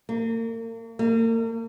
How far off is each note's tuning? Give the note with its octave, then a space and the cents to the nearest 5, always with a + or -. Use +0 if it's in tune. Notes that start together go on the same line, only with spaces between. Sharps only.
A#3 -40
A#3 -40